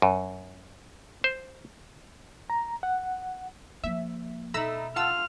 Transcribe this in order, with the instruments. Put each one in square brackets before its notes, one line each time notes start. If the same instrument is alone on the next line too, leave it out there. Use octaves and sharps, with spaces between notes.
[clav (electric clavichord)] F#2
C5
[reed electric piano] A#5
F#5
[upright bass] F3 A#3 [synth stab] E5
[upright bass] B2 [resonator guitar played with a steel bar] A3 D#4 [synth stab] A#5 B5 E6
[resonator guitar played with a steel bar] F4 [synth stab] F#5 A5 E6 [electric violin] F6